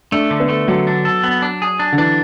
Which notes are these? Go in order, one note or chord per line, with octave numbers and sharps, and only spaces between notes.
A3 D4
D3
B3
A3
D3 F#3
D4
A4
B3
D4
G#4
D4
D3
E3 D4